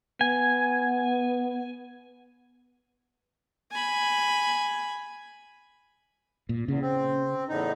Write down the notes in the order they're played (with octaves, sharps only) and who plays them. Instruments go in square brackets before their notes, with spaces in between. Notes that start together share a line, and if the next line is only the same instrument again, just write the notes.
[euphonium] B3 [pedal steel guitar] G#5
[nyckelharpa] G#5 B5
[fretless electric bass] A#2
[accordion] E2 [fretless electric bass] C#3
[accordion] C4
E2 A2 D#4